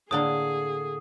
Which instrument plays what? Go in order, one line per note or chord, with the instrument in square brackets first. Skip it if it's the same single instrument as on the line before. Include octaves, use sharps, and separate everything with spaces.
[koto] A2 D3 A#3 [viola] G#4 [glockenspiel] D#6